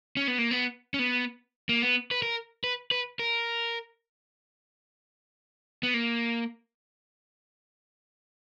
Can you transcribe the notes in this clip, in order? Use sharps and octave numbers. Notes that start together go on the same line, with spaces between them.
C#4
B3
A#3
B3
C#4
B3
A#3
B3
B4
A#4
B4
B4
A#4
B3
A#3